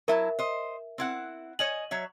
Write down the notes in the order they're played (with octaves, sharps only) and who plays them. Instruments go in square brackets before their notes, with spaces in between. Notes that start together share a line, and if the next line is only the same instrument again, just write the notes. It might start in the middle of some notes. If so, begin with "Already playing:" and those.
[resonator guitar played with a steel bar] F#3 E4 A5 [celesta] A#4 E5
[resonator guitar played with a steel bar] C5 D#5
C4 E4 F#5
[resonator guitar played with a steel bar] C#5 D#5 G#5 [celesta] F#7
[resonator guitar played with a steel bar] F#3 C#5 E5